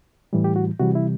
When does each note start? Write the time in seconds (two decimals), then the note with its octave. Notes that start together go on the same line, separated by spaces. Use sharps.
0.33 A2 E3 G3
0.44 G4
0.56 F#4
0.79 C3 E3 G3 F#4
0.95 E4